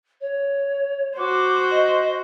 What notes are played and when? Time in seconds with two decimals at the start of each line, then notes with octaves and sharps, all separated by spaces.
0.21 C#5
1.18 F#4 C5 D6
1.71 D#5